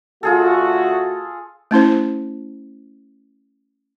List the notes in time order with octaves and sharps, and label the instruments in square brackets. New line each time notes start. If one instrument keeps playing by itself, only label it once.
[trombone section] D3 A3 F#4 [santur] F4 G#4 A4
[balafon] A3 C#4 E4 C5